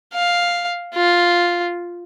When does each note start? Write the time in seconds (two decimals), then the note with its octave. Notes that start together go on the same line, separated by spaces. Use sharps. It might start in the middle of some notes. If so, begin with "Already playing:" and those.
0.14 F5
0.94 F4